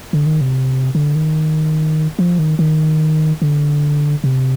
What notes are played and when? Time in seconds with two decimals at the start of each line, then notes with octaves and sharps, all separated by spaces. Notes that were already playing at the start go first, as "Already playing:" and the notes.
0.13 D3
0.26 D#3
0.41 C3
0.95 D3
1.15 D#3
2.19 F3
2.39 D#3
2.59 D#3
3.42 D3
4.24 C3